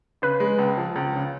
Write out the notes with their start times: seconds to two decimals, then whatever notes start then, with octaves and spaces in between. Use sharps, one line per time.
0.22 C#3 B4
0.40 G#3
0.59 C#2
0.77 F3
0.96 C#2
1.15 C#3